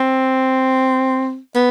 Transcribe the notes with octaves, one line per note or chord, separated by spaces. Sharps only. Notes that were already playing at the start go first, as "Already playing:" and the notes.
Already playing: C4
B3